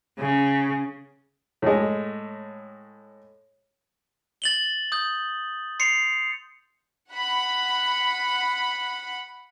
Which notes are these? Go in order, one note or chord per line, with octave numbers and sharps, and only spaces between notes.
C#3
A2 G#3
A6 F#7 G7
D#6 G6
C6 C7 C#7 F7
F#5 B5